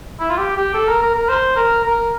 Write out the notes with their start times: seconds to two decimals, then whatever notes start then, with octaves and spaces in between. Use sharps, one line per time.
0.20 E4
0.30 F4
0.38 G4
0.56 G4
0.74 A4
0.88 A#4
1.02 A#4
1.15 A#4
1.29 C5
1.56 A#4
1.84 A#4